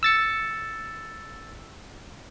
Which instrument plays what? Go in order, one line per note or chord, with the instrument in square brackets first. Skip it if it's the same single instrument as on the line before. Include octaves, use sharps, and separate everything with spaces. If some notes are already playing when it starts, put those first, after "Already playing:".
[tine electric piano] E6 A6 C#7